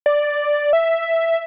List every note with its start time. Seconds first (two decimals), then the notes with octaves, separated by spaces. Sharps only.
0.06 D5
0.73 E5